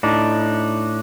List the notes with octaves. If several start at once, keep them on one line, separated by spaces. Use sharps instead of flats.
A2 D4 D#4